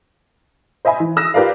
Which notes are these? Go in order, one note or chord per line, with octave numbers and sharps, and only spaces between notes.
C5 D#5 E5 G#5 B5
E3
D#6 E6 F#6 A#6
F4 G4 A#4 B4 D5 F5